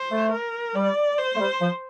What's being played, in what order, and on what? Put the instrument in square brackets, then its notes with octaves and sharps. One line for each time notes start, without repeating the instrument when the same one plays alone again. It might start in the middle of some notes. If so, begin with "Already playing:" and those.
Already playing: [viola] C5
[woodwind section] A3
[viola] A#4
[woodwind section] G3 [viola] D5
[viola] C5
[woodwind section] A3
G3
F3